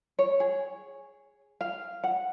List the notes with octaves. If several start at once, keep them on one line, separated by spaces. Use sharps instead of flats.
C#5
G#4
F5
F#5